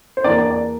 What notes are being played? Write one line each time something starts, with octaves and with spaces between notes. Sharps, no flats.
C5
E2 E3 A#3 D4 D5
D5
D5